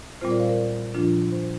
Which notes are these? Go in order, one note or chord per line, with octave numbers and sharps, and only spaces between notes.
A#2 G3 C4 F4 C5
A#4 D5
C5 F5
A#4 D5
A#2 F3 D4 F4
C5